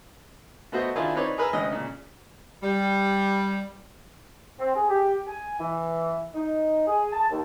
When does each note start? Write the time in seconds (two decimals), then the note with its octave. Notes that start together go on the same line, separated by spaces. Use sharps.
0.72 A3 B3 F#4 C5 D#5
0.95 D#3 D4 E4 F4 G#4 D5
1.15 C4 D#4 B4 C#5 D5
1.38 G#4 A#4 B4 A#5 E6 F6
1.53 G#1 D2 C#3 G#3 D#5
1.72 A#2 C#3
2.63 G3
4.59 C4
4.74 G#4
4.89 G4
5.26 G#5
5.59 E3
6.34 D#4
6.86 G#4
7.12 A5
7.30 D#2